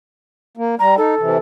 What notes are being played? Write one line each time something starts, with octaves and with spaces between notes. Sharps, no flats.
A#3
G3 A#5
D#4 A4
C3 E3